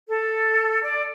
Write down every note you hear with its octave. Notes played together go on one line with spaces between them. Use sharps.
A4
D5